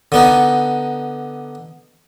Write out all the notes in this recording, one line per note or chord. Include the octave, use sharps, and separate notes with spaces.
D3 B3 D#4